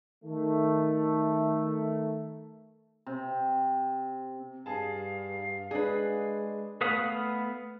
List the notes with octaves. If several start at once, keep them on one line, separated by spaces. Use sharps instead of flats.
D#3 A3
C3
G2 G#4 F5 A5
G#3 D4 G#4 B4
A3 B3 B4 F5 D#6